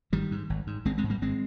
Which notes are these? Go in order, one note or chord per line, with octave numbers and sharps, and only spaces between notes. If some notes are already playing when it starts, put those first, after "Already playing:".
G#1 D#3 G3
G#2
G#1
G#2
G#1 G#3 C4
G#3 C4
G#2
G3 A#3
G#1 G#3 C4